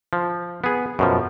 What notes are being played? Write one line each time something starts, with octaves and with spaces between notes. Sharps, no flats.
F3
B3 G#4
F#2 B2 F3